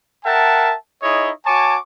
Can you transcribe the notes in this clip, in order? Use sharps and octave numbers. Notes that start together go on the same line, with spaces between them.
A#4 E5 F#5 G5 A5
D#4 E4 G#4 C#5 D#5
F#4 C#5 G#5 A5 C#6 D6